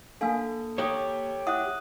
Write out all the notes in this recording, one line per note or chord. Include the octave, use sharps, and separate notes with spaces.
A#3 D4 A4 F5 G#5
G4 C#5 A#5 D#6
E4 E5 F#5 D#6 F#6